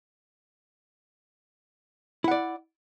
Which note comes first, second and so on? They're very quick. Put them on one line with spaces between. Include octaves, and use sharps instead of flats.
E4 F#5 D5